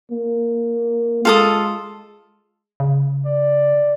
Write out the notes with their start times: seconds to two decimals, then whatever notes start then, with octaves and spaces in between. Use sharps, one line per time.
0.11 A#3
1.25 G#3 F4 A4 D#6
2.80 C#3
3.25 D5